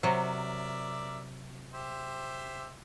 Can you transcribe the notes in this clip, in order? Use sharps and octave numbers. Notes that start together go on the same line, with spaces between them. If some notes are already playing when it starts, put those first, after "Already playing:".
C3 F#3 A#4 D5 E5
G4 C5 E5